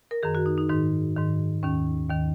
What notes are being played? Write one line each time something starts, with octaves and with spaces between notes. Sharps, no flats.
A#4
F#2 D#3 G#4
F#4
D#4
D#4
G#2 D#3 D#4
G#2 D#3
D#2 D#3 C#4
D#2 D#3